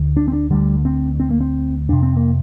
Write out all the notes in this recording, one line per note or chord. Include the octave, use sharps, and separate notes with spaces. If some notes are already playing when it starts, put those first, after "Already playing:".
Already playing: D2 D3
D4
C4
D4
D2 D3 G3
C4
C4
A#3
C4
F2 C3 D4
C4
A#3